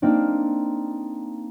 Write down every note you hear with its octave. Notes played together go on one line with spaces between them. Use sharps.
A#3 C4 D4 D#4